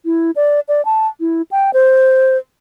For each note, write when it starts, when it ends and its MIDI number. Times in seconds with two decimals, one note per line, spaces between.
0.05 0.31 64
0.36 0.60 74
0.68 0.84 74
0.85 1.07 81
1.20 1.42 64
1.51 1.71 79
1.74 2.37 72